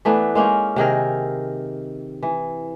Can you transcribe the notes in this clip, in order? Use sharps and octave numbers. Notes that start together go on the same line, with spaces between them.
E3 A3 B3 D4
G#3 A#3 C#4 D#4
C3 D#3 G#4 A#4
E3